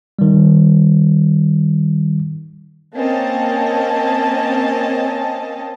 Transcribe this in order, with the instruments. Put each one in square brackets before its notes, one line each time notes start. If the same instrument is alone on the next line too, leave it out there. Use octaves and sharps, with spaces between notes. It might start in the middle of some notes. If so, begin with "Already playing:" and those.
[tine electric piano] D#3 G3
[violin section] A#3 C4 C#4 D#5 A5